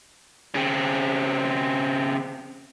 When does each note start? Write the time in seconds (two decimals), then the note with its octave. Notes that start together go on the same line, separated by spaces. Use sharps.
0.55 C#3 C4